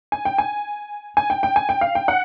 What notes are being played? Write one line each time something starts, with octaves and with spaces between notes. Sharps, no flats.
G#5
G5
G#5
G#5
G5
G5
G#5
G5
F5
G5
F#5